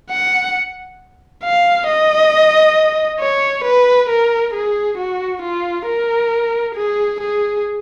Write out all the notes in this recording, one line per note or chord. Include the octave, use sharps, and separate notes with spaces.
F#5
F5
D#5
C#5
B4
A#4
G#4
F#4
F4
A#4
G#4
G#4